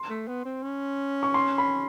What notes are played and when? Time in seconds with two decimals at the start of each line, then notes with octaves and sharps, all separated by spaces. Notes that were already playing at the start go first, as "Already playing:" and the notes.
Already playing: C6
0.09 A3
0.27 B3
0.45 C4
0.63 C#4
1.23 C#6
1.34 C6
1.58 B5